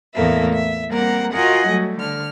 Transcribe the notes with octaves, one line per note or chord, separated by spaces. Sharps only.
E2 A2 A3 A#3 E5
E5
G3 A#3 C4 A#4 F#5 A#5
F4 F#4 A#4 D#5 F#5 G#5
F#3 G3 A3
D3 F6